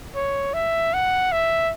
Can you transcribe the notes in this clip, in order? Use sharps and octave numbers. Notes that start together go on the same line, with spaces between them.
C#5
E5
F#5
E5